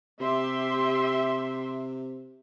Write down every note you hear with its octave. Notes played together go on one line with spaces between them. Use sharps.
C3 G4 E5 C6